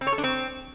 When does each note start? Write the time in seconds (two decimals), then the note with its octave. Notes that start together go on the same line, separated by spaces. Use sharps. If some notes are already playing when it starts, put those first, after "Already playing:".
0.01 C4
0.07 C#5
0.12 A4
0.18 D4
0.24 C4